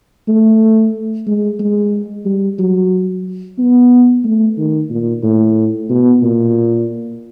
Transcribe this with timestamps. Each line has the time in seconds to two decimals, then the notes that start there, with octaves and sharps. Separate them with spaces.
0.28 A3
1.27 G#3
1.60 G#3
2.26 G3
2.59 F#3
3.58 B3
4.24 A3
4.57 D#3
4.90 A#2
5.23 A2
5.90 B2
6.23 A#2